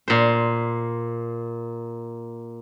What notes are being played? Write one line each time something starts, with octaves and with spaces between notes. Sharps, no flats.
A#2 C5